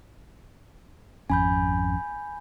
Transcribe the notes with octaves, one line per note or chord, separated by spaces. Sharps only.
G#1 F2 C#4 G#5 B5 G6